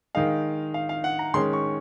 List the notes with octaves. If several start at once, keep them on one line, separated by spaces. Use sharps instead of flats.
D#3 G#3 D#4 F5
F5
F5
F#5
A#5
D#3 G#3 C#4 C6
C#6